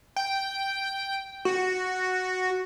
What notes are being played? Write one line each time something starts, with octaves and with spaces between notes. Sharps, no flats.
G5
F#4